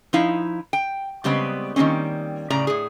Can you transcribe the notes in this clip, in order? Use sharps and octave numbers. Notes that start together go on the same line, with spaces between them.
F3 D#4 E4 F5
G5
C#3 G3 G#3 B3 C4
D#3 G3 A#3 C4 C#4
A2 C#3 D5 A#5
A2 G#4